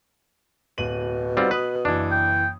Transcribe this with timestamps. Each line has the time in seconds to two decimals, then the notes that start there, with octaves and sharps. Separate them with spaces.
0.78 D1 B2 D#7 F#7
1.37 G3 C4 D#4 F4 F#5
1.51 B4 D#6 F#7
1.85 F#1 E3 D4
2.11 G5